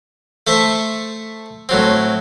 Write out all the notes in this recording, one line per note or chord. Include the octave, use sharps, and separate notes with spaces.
A3 A4 C5 E5
A2 F#3 C4